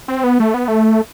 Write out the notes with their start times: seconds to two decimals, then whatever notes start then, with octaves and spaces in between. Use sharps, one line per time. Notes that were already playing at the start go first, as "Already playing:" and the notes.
0.08 C4
0.24 B3
0.40 A3
0.54 B3
0.68 A3